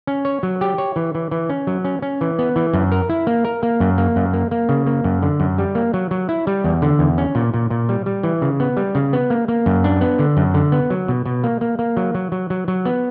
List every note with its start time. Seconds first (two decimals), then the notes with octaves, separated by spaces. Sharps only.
0.07 C#4
0.25 C#5
0.43 F#3
0.61 G4
0.78 C#5
0.96 E3
1.15 E3
1.31 E3
1.49 C#4
1.67 F#3
1.85 C#4
2.02 C#4
2.21 E3
2.39 B3
2.56 E3
2.74 F#2
2.92 A#4
3.09 E4
3.27 A#3
3.45 A#4
3.63 A#3
3.80 F#2
3.98 A#3
4.16 F#2
4.33 A#3
4.51 A#3
4.69 C#3
4.87 A#3
5.04 F#2
5.22 D3
5.40 F#2
5.58 G3
5.75 A#3
5.94 F#3
6.11 F#3
6.29 E4
6.47 G3
6.64 E2
6.82 D3
6.99 E2
7.18 C#4
7.35 A#2
7.54 A#2
7.70 A#2
7.89 G3
8.06 G3
8.23 E3
8.42 C#3
8.60 B3
8.77 G3
8.95 C#3
9.13 B3
9.30 A#3
9.48 A#3
9.66 F#2
9.84 D4
10.01 B3
10.19 D3
10.37 F#2
10.54 D3
10.72 B3
10.90 F#3
11.08 B2
11.26 B2
11.44 A#3
11.61 A#3
11.79 A#3
11.97 F#3
12.15 F#3
12.32 F#3
12.50 F#3
12.68 F#3
12.85 B3